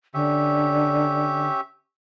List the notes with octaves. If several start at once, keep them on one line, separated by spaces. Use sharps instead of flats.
D3 C#4 G4 E5